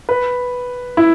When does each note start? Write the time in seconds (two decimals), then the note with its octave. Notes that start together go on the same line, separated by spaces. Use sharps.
0.09 B4
0.97 E4